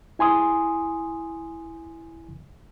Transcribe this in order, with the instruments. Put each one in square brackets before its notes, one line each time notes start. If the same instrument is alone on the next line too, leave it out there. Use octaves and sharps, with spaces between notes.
[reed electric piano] E4 G#5 C6 D#6